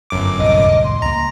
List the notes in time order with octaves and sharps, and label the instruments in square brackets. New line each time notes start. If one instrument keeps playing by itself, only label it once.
[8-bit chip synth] G1 F#2 D6
[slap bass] D1 C2 F2 [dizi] D#5
[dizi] C6
[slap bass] C#2 A#3 [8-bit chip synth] A#5